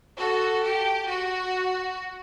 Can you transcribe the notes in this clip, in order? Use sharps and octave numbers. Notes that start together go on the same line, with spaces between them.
F#4 A4
G4
F#4